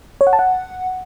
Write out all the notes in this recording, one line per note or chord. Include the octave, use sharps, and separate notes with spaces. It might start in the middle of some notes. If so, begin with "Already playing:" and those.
C#5
F#5
A5
F#5